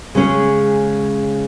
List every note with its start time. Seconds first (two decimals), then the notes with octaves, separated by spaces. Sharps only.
0.15 C#3 G#3 C#4 G#4